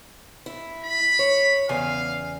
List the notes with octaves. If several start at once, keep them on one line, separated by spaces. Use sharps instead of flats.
E4
B5
C#5
E2 C#3 F5 G#5